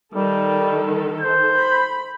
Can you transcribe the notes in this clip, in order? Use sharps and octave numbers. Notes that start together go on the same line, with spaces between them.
D#3 G3 A4
C5 G6
B5